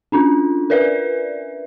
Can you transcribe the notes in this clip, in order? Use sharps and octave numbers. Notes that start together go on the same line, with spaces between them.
C#4 D4 F4
A#4 B4 D5 E5